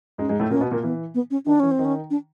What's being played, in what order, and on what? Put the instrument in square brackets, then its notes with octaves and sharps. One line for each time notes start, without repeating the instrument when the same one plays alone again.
[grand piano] G#2 G#3 [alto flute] C#4
[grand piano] G#2 G#3
A2 A3
[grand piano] A#2 A#3 [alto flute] C#4
[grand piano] B2 B3
A#2 A#3
[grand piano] E3 [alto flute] B3
[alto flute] B3
C#4
[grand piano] D#3 [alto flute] D4
[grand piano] E3 [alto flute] C#4
[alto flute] C4
[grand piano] D#3
[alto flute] C#4
D4